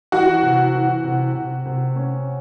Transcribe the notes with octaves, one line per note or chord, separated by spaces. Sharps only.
E3 F#4
C3
E3
C3
C3
C3
C#4